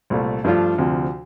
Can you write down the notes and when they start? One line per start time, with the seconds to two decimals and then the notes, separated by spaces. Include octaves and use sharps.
0.10 C2 A#2 A3
0.44 G2 F3 A3 D4 F4
0.78 D2 C3 F3